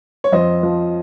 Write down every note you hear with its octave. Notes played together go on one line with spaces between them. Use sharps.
C#5
F2 C5 D#5
F3